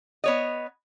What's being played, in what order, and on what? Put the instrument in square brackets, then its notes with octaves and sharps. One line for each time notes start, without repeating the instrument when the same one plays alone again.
[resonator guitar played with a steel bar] B3 C#5 D#5